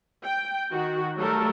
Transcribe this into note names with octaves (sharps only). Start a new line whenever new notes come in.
G5
D#3 F#4
F#3 G3 A3 A4 A#4